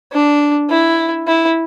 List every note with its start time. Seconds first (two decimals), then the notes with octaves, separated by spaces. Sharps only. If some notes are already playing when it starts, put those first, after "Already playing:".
0.13 D4
0.70 E4
1.27 E4